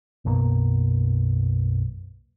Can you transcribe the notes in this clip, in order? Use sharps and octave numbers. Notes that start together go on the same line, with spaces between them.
B1 F#2 B2 A#3